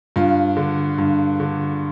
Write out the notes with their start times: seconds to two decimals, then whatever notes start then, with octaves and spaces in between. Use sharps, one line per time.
0.16 G2 F4
0.57 D3
0.98 G2
1.40 D3